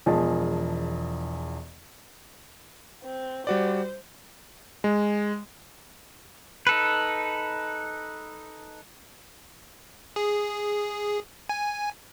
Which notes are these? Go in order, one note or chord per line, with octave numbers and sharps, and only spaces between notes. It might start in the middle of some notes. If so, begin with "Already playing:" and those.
E1 E2 F3 G#4 D#5 A5
C4
G3 F#4 C5 D5
G#3
D#4 A4 B4
G#4
G#5